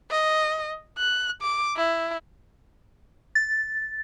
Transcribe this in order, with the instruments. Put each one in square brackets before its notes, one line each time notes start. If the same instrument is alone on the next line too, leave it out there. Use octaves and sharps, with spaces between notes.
[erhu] D#5
F#6
D6
E4
[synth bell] A6